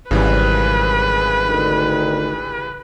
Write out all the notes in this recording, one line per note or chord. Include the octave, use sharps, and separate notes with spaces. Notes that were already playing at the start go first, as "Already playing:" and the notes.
G#1 C#3 E3 G3 B4
D2 D3 D#3